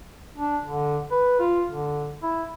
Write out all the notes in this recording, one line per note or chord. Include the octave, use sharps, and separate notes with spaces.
D4
D3
B4
F4
D3
E4